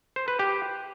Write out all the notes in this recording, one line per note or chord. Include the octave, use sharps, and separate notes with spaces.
C5
B4
G4